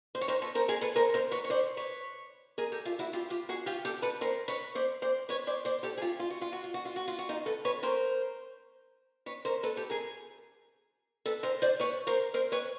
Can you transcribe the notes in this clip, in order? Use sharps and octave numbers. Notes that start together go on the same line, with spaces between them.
C5
C#5
A#4 C5
A4 B4
A#4 C5
G#4 A#4
A4 B4
A#4 C5
A#4 C5
B4 C#5
C#5
C5 D5
B4 C#5
G#4 A#4
G4 A4
F4 G4
E4 F#4
F4 G4
F4 G4
F#4 G#4
F4 G4
G4 A4
A4 B4
A#4 C5
B4 C#5
C5 D5
C5 D5
B4 C#5
C5 D5
C5 D5
G4 A4
G#4
F4 G4
F4
F#4
F4
F#4
F4
F#4
F4
F#4
F4
F#4
D#4 F4
A4 B4
B4 C#5
A#4 C5
B4 C#5
A#4 C5
A4 B4
G4 A4
G#4 A#4
A4 B4
A#4 C5
C5 D5
B4 C#5
A#4 C5
A#4 C5
B4 C#5